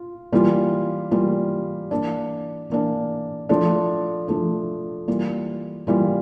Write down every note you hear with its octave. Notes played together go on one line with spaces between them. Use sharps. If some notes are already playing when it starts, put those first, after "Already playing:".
Already playing: F4
E3 G3 A#3 F4
E3 G3 A#3 F4
E3 A#3 D4
E3 A#3 D4
F3 A3 D4
F3 A3 D4
E3 G3 A#3 F4
E3 G3 A#3 F4